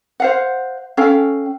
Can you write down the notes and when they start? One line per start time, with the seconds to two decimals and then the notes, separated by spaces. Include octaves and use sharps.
0.20 C5 F5 F#5
0.97 C#4 A4 F5 G5